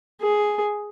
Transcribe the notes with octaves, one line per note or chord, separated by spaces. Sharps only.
G#4